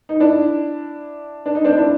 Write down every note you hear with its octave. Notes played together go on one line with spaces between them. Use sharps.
D#4
D4 E4
D4
D#4
C4 D4
D4 E4